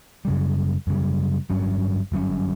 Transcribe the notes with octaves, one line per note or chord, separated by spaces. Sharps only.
F#2 C#3 G3
F#2 C#3 G3
G1 G2 F#3 C#4
G1 G2 F#3 C#4